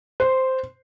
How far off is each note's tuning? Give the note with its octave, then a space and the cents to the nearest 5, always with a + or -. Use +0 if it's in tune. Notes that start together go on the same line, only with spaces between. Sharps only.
C5 -5